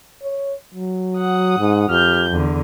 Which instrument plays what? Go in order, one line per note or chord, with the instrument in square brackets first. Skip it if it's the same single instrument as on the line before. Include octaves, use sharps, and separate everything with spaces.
[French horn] C#5
F#3
[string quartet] F#5 D#6
[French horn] G#2
[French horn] F2 [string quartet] G4 F6 G6
[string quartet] E2 D3